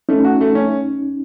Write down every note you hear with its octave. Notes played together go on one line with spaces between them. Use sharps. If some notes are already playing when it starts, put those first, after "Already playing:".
A3 C#4 D#4
F#4
A3
C#4